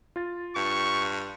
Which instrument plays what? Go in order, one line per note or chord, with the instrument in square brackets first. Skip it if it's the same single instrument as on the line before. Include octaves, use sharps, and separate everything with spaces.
[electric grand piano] F4 A6
[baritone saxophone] G2 [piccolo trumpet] C#6